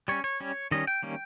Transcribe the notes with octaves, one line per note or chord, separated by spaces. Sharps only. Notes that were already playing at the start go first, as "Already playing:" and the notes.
G3 C#4 C#5
C#5
G3 C#4
D#3 G3 C#4 D#5
G5
D#3 G3 A#3 C#4